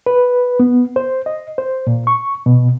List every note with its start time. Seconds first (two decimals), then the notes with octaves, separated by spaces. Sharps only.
0.06 B4
0.60 B3
0.96 C5
1.26 D#5
1.58 C5
1.87 A#2
2.07 C#6
2.46 B2